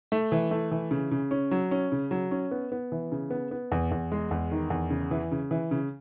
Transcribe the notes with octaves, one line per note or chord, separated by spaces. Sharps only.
A3
E3
A3
E3
C#3
C#3
C#4
F#3
C#4
C#3
F#3
C#4
B3
B3
E3
C#3
B3
B3
E2
E2
G#3
E2
D#3
E2
C#3
E3
C#3
E3
C#3